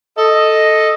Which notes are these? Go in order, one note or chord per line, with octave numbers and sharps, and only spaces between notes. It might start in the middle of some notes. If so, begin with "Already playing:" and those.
A4 D#5